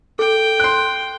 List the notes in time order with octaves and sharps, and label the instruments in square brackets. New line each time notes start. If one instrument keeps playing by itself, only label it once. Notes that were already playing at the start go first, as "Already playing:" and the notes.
[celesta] A4 [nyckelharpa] G5
[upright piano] C6 F#6